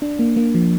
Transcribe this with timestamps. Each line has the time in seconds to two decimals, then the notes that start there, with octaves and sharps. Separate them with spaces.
0.02 D4
0.19 A#3
0.36 A#3
0.54 F3